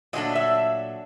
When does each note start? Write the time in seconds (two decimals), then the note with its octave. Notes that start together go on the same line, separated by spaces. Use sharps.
0.13 A#2 F#3 A3 D4 D#5
0.35 E5